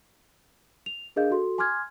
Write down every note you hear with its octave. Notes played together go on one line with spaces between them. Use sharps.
F7
D4 G#4 A#4 D#5 F5 G6
F#4 A4 C6
G#5 C6 D6 F6 G#6